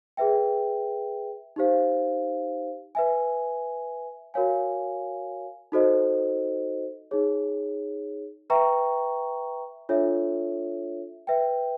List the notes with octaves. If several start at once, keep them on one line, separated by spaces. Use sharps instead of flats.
G#4 B4 E5 G5
D#4 G4 C5 F5
B4 E5 G#5
F#4 A#4 C#5 F5 G#5
D#4 F#4 A4 C5 D#5
D#4 G#4 C#5
B4 E5 G5 A#5 C#6
D4 F4 A4 C#5 E5
B4 E5 G5